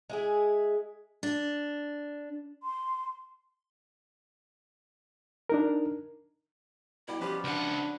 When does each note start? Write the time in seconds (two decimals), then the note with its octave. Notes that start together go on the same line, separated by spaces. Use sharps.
0.10 G#3 E4 G#4
1.23 D4
2.63 C6
5.49 D4 D#4 A#4
7.08 B2 G3 E4 G5
7.21 F3 C#4 G4 B4 D5
7.44 C#2 D4 F#5